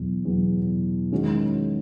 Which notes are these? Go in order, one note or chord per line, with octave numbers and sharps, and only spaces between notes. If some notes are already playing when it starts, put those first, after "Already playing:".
Already playing: E2 B2 F#3
E2 B2 F#3
D#3 G#3 C#4 F#4